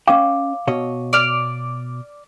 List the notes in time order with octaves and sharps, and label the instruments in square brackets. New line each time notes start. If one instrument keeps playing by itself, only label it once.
[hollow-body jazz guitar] C#4 D#5 G5 [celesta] F5 D6
[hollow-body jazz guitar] B2 C#5 D#5
[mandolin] D5 F6